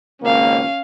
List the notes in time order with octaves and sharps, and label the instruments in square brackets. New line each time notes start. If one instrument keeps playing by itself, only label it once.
[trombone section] G#1 C#2 A#3 [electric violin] C#4 F5